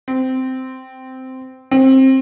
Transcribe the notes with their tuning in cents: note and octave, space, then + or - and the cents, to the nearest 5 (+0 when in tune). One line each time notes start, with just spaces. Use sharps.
C4 -10
C4 +20